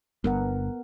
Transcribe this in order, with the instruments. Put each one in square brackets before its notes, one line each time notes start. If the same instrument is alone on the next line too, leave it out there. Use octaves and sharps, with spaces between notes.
[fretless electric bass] G1 G2 [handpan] B3 A#4 F#5